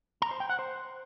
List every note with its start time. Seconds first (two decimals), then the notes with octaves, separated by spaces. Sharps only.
0.22 A#5
0.31 C5
0.40 G5
0.49 F#5
0.59 C5